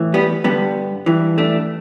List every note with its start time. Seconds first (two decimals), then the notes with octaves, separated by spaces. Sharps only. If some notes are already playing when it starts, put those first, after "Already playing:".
Already playing: A2 E3
0.14 G3 B3
0.44 G2 D3 G3 B3
1.06 G2 E3
1.38 A3 D4